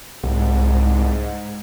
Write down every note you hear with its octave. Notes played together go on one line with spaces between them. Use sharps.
C2 G#2